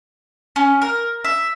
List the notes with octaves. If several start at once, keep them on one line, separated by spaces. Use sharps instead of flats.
C#4
A#4
E5